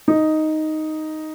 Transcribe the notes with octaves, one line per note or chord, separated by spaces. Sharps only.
D#4